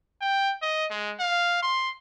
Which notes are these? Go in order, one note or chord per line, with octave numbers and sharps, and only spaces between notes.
G5
D#5
G#3
F5
C6